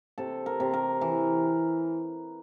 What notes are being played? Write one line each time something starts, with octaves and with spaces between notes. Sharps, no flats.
C3 A4
A#4
C3
A#4
E3